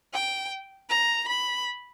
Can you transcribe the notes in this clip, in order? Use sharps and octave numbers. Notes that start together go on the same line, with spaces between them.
G5
A#5
B5